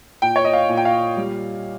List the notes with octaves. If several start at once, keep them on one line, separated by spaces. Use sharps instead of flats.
A#2 G5
C#5
D#5
F5
A#2
G5
F5
G3